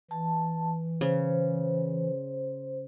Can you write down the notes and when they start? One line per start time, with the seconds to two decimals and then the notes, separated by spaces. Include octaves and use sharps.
0.11 E3 A5
1.01 C#3 C5